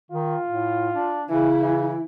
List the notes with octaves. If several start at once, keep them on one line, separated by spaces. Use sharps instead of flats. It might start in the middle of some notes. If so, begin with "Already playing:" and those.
D#3 F4
A2
D4
C#3 E3 E4
E3